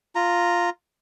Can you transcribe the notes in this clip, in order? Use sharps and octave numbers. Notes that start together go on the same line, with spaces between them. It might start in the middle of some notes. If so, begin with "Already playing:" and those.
F4 A#5